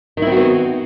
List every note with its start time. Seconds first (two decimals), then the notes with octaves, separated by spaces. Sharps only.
0.17 D#3
0.22 E4
0.27 C4
0.32 F#4
0.37 B3